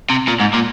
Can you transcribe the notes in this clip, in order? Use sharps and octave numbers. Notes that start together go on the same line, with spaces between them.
C3
A#2
G#2
A#2